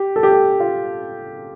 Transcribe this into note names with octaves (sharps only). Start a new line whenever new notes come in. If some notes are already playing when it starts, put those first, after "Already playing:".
Already playing: G4
A4
G4
A4
F4